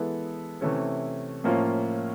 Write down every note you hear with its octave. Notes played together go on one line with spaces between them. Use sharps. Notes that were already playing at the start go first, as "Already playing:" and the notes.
Already playing: E3 G#3 B3 E4 A4
C3 E3 A3 C#4
A2 F3 A#3 C#4 F4